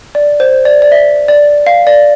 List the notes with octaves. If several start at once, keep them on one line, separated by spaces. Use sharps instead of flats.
D5
C5
D5
D5
E5
D5
F5
D5